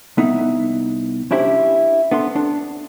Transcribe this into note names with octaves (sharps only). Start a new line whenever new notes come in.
C2 B3 D#4 E4
C#4 D4 E4 G4 C5
B3 D4 A4 C6
D4